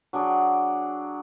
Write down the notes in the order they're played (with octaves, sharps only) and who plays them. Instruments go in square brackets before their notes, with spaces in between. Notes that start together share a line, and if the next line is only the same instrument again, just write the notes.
[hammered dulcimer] F#3 D4 G#4 D5